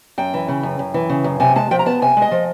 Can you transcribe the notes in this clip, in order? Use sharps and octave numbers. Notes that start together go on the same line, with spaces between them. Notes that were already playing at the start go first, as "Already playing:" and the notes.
F#2 G5
E3
C#3
F#2
F#2
E3
C#3
F#2
C3 G#5
G#3 A5
F3 G5
A#5
B3 A5
C3 G#5
G#3 D#5
F3